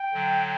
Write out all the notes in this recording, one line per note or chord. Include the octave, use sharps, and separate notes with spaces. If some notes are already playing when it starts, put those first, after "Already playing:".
Already playing: G5
D3 F#3